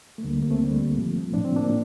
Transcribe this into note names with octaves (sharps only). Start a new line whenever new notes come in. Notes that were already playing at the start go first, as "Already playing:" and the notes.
A3
D2 D3 G3 A#3
A3
A#3
A3 C4
D2 D3 G3
A2 F3
A2 F3 D4
C4
A#3 D4